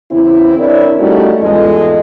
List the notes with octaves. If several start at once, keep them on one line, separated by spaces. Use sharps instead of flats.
E2 C#3 C4 E4
C4 D4 E4 A#4 C#5 D5
G3 A3 C#4 D#4 E4 F#4
E2 G#2 G#3 F4 A4 D#5